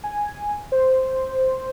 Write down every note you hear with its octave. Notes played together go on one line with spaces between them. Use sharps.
G#5
C5